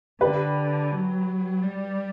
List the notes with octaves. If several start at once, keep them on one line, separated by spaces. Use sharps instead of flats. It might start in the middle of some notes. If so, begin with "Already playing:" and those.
D3 G4 B4
F#3
G3